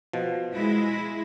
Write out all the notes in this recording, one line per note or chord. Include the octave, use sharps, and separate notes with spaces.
B2 F3
G#3 E4